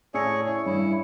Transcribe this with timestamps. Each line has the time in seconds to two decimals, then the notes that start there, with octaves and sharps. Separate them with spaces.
0.14 A2 G#4 C#5 D5 A5 E6 A#6 C#7
0.46 C#4 E4 C#5
0.66 G2 C#4 E4